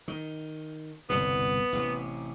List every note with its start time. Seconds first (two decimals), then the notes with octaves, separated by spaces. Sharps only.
0.08 D#3
1.09 G1 C2 B2 B3
1.73 A1 C3